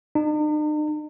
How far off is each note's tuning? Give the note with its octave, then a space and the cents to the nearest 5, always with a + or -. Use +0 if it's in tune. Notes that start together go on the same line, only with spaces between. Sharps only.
D#4 -45